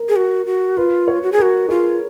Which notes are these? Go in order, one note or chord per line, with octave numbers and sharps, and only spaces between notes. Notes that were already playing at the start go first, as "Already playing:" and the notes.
Already playing: A#4
G#4
F#4
F#4
F4 B4
C#5
F#4
G#4
F#4 A#4
F4 G#4